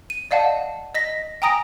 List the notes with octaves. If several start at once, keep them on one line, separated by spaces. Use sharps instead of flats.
D#7
D5 D#5 F5 F#5 A5
D#5 A#6 B6
G5 G#5 A#5 D#6 A#6 D7